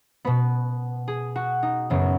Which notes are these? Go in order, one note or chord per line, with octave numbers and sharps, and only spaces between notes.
B2 B3 B4
G#4
F#4
D#4
F#2 C#3 F#3 B3